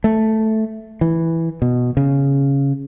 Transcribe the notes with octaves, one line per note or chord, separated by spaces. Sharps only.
A3
E3
B2
C#3